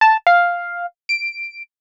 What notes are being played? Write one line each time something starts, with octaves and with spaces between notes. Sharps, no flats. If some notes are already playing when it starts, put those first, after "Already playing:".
A5
F5
D7